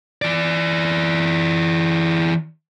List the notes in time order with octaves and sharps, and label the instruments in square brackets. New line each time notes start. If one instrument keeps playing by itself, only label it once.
[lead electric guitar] E3 D5